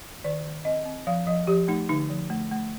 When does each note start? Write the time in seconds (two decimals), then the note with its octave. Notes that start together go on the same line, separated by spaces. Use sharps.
0.24 D#3 D5
0.45 D#3
0.65 C4 D#5
0.85 C4
1.07 F3 F5
1.27 F3 D#5
1.47 F3 G4
1.68 A3 D#4
1.89 D3 D#4
2.10 F3
2.30 A3
2.51 A3